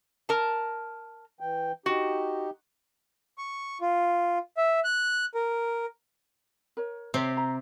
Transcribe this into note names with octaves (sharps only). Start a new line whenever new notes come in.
A#4 A5
E3 G5
D#4 F#4 G4
C#6
F4
E5
F#6
A#4
A#4 C#5
C3 C4 G4 C5 C#5
A#5